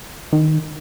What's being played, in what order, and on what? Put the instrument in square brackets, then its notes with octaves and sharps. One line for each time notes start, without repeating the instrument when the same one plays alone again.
[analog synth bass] D#3